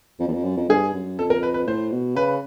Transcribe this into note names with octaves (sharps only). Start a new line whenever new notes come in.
F2
E2
F2
F#2
F2
G2 G#4
F#2
F2 A4
A#4
B4
B4
A2 C5
B2
C#3 B4